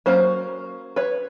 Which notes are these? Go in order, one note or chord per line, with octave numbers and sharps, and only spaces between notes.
F#3 A#3 C#4 C5
B4 C#5